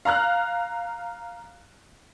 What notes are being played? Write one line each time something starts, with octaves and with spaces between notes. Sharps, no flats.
F5 A#5 F6 F#6